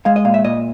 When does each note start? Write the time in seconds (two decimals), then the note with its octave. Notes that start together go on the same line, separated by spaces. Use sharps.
0.05 G#3 F5
0.16 D#5
0.25 A#2 F5
0.34 E5
0.44 A#2 D#5